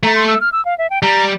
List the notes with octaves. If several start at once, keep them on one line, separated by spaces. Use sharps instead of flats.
A3 A#5
C6
E6
F6
E6
F5
E5
G5
G3 A#5